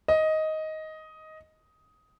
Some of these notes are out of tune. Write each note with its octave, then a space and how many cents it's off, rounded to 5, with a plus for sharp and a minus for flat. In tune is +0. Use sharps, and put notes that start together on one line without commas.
D#5 +10